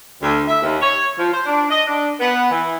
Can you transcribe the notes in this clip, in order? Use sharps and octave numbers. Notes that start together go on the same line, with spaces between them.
D2
E5
D#2
C#5
F3
C5
D4
D#5
D4
B3
E3